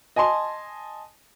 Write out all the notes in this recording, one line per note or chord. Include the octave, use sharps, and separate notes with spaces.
D#5 G#5 A5 C6